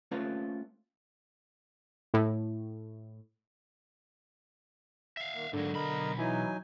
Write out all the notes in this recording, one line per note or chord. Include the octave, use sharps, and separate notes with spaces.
A3 C4 C#4 F4 B4 A#5
A2
E5 F5
D#3 A#3
G#2 D3 F#3 A#3
B1 A#4 D#5 A#5 B5
E3 F#3 D#4 G#5